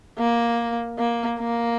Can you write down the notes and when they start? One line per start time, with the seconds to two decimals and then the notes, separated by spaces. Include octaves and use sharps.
0.18 A#3
0.98 A#3
1.39 A#3